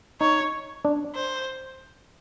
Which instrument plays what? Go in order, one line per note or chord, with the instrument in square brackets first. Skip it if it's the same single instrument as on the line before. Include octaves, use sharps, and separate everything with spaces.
[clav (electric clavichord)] D#4 [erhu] C#5
[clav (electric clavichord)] D4
[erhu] C5